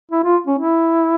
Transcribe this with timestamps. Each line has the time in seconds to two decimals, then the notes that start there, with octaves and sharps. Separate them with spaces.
0.11 E4
0.24 F4
0.47 C#4
0.58 E4